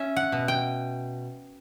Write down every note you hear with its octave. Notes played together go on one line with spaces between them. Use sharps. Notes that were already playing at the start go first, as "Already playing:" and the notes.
Already playing: C#4 E5
F#5
B2
G5